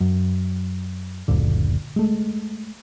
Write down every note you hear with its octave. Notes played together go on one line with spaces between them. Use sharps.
F#2
F#1 D2 A#2 D3
G#3 A3